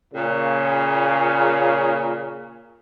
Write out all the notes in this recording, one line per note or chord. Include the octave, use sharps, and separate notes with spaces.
A#2 C#3